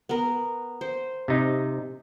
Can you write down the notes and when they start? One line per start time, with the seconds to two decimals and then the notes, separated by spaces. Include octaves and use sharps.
0.09 B3 A#4
0.81 C5
1.28 C3 D#4